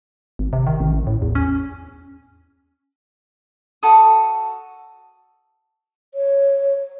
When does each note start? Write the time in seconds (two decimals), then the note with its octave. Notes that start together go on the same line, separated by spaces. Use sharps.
0.39 G#1
0.53 C3
0.67 D#3
0.80 A1
0.93 A1
1.07 A2
1.22 E2
1.35 C#4
3.83 F#4 A4 D#6
6.14 C#5